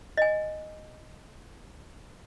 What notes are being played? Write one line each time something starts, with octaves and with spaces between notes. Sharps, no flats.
D#5 G#5